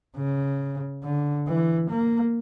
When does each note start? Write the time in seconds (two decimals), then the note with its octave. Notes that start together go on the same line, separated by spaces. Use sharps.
0.17 C#3
1.03 D3
1.47 E3
1.90 A#3